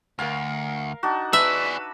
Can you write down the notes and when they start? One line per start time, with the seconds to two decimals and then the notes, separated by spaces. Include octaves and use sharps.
0.19 D2 A#4 F5
1.03 D4 D#4 F#4
1.33 G#4 B4 D5 E5
1.65 B5